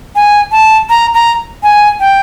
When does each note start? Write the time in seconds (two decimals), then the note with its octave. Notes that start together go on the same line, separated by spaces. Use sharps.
0.15 G#5
0.51 A5
0.89 A#5
1.14 A#5
1.63 G#5
2.00 G5